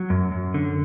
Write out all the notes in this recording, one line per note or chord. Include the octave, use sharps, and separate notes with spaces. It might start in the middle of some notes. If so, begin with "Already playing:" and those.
Already playing: F#3
F#2
F#2
D3